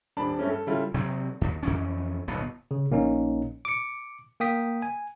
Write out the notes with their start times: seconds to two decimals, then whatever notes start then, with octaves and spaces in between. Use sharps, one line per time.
0.17 D#1 D4 A5 B5
0.39 G2 G3 A3 C#4
0.50 A4
0.67 C#3 G3 E4 F4 A4
0.94 C3 F#3 C4
1.41 D#2
1.63 F2 E3 C#4
2.28 D1 B1 B3
2.71 C#3
2.91 A#1 A#3 C#4 D#4
3.65 D6 C#7
4.40 A#3 G5 D#6 B6
4.82 G#5